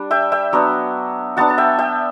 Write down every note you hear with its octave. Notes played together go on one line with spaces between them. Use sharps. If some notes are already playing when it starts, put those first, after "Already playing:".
Already playing: G3 D4
E5 G5
E5 G5
F#3 B3 D4
F#3 B3 D4 F#5 A5
A5
E5 G5
E5 G5